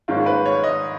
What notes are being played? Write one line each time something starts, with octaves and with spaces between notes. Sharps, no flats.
G#2 D#3 A#3 C#4 F4
B4
C#5
D#5